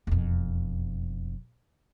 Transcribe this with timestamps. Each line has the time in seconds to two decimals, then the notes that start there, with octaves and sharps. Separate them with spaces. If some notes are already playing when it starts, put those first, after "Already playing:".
0.07 E1 F2